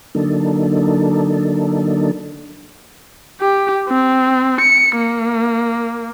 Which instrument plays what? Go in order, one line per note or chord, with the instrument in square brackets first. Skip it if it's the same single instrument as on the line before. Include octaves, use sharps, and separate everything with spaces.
[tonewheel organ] D3 F#3 A#3 D4 D#4 A4
[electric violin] G4
C4
C#7
A#3